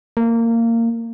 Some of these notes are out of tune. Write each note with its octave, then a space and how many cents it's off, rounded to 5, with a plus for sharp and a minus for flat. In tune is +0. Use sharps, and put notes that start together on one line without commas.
A#3 -20